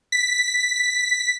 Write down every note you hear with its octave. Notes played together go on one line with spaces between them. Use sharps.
B6